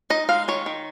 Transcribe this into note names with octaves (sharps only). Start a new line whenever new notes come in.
D#4 D#5
G#3 F5
D#3 C#5
D#3